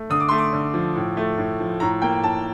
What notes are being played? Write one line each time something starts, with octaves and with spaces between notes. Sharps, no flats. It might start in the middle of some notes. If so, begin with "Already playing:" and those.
Already playing: A3
D3 D#6
D6
A3 C6
D6
D3
F3
A2
A3
A2
F3
A2 A#5
A#3 G5
A2 A5